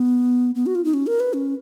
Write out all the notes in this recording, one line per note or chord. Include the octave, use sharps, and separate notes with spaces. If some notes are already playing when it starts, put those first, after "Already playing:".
Already playing: B3
B3
F#4
F4
D#4
C#4
A#4
B4
C#4